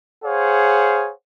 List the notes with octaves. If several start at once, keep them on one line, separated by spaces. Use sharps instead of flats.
G#4 C5 C#5 F5 F#5